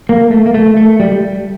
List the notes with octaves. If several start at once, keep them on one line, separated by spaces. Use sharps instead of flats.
A#3
A3
A#3
A3
A3
G3